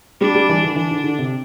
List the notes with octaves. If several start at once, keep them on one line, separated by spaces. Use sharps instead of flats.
G3 D4
G3
E3
D3
E3 D4
D3
D3
C3